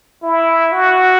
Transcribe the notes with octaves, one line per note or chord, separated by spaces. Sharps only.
E4
F#4